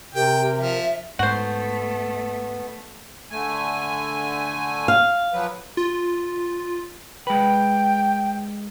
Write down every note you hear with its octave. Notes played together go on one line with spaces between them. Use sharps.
C3 G4 A#4 G5
F3 E5
G#2 A3 B3 F#4 C5
D3 A3 G#5
F5
F3 F#3 B4
F4
G#3 B4 G5